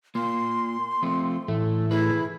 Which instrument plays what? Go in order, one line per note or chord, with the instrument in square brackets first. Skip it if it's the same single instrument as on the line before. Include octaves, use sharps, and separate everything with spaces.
[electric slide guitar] A#3 F4 [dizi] C6
[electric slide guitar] F3 A3 C4
[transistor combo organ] A2 E3 [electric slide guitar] A3
[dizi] E4 [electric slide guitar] G#4 B4